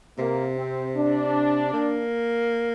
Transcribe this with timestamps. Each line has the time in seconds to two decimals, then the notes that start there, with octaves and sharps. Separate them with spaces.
0.18 C3 A#3
0.57 C4
0.96 D4
1.73 A#3